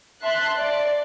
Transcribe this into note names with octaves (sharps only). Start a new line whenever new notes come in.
E5 A5 C6 F#6
D5